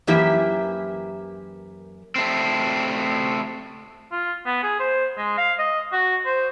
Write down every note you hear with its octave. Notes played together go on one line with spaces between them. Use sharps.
F#2 E3 A#3 E4 G4 E5
A3 C4
F4
B3
G#4
C5
G#3
F5
D#5
F#4
C5